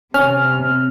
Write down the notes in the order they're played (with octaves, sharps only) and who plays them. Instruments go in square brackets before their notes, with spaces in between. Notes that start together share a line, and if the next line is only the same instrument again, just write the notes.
[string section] C3 [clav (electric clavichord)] C#4 [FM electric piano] F6